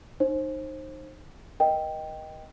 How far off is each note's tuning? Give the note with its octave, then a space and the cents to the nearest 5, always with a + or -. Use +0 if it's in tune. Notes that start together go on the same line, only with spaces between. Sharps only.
D#4 -20 C5 +25
A#4 +40 D#5 +5 G5 +0